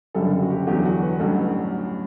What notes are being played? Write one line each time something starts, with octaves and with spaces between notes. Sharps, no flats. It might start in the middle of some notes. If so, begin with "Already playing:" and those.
F#1 F#2 D3 G3 A4
F#4
G4
E2 D3 F#3 G4
F#4
B4
A1 G2 F#3 A4